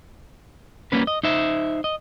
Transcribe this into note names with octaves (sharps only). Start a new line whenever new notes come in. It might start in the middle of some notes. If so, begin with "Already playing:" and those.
G3 A#3 C#4 B4
D#5
D#4 C5 E5
D#5